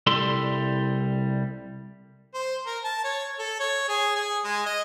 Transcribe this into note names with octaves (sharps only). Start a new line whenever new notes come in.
C2 G3 E4 A4 C6
C5
A#4
A5
C#5
A4
C#5
G#4
G#4
G#3
D#5